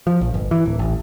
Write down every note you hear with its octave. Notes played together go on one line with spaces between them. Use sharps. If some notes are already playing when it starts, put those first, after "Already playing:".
F3
A#1
G1
E3
D1
A1